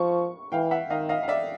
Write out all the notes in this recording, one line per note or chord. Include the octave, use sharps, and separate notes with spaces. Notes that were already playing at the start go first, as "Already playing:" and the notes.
Already playing: F3 C#6
E3 F5 G5
E5 F#5
D#3 D#5 F5
D#5 F5
F5
D5 E5